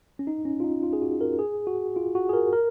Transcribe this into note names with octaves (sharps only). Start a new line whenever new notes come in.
C#4
D#4
C#4
F4
D#4
F4
G#4
F#4
A#4
G#4
F#4
F4
F#4
G#4
A#4
A#4